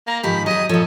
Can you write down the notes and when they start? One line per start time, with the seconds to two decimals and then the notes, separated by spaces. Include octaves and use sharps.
0.07 A#3 A#5
0.23 G#2 D#3 F3 G4 B5
0.46 F#3 G#4 D#5 D#6
0.69 A#2 F3 A4 C#5